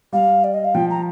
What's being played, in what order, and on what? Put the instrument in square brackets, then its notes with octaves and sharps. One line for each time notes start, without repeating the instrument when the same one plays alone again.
[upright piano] G3 [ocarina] F5
[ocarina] D5
D#5
F5
[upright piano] F3 [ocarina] G5
[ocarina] A#5